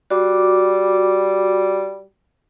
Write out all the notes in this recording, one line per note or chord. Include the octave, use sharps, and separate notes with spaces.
G3 F#4 D6